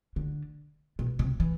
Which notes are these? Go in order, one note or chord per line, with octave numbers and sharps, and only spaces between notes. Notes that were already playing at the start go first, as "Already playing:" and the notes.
D3
B2
C3
E3